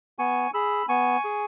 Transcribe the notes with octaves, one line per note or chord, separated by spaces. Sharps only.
B3 G#5 C#6
G#4 B5 E6
B3 G#5 C#6
G#4